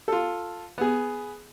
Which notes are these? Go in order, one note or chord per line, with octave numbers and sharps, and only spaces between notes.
F4 A4
B3 G#4